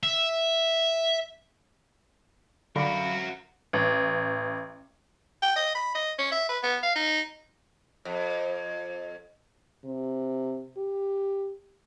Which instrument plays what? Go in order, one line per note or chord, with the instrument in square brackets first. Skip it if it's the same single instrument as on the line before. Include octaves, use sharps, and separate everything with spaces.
[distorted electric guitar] E5
[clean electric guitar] F#2 F5 B5 [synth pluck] D3 [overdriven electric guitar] F#4 A#4
[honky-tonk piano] A1
[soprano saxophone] G5
D#5
B5
D#5
C#4
E5
B4
B3
F5
D#4
[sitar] F2
[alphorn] C3
G4